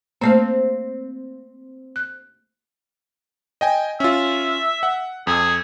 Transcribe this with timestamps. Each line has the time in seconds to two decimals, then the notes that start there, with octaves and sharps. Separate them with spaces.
0.21 A3 A#3 C4 C5 F5
1.96 F#6
3.61 D#5 G5 G#5
4.00 C#4 F4 E5
4.83 F#5
5.27 F2 G#4 E6